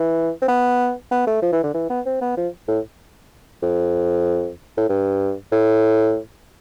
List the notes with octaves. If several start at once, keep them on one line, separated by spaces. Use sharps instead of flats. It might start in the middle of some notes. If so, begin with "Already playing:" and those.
Already playing: E3
C4
B3
B3
A3
F3
E3
D3
E3
B3
C4
B3
F3
A2
F2
A2
G2
A2